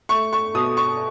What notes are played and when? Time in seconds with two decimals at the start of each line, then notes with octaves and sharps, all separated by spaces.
0.09 A3 C#6
0.33 C#6
0.54 B2 D#6
0.77 C#6